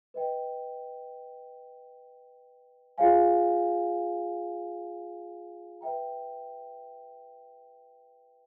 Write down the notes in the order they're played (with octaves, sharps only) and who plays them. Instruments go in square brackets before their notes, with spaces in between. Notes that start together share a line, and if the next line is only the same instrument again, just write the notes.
[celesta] B4 D#5 G5
F4 G#4 C#5 F5 G#5
B4 E5 G5 A#5